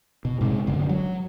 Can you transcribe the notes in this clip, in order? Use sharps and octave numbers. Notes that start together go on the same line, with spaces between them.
B2
G#2 C3 G#3
G1 F#2 D3 F#3
F#3